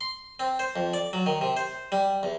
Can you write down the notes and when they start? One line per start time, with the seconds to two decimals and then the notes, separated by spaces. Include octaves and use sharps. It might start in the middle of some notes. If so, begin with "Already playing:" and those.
0.01 C6
0.40 C4
0.59 C5
0.76 F2
0.93 D5
1.13 F#3
1.26 D#3
1.41 C3
1.57 C5
1.92 G3
2.23 E2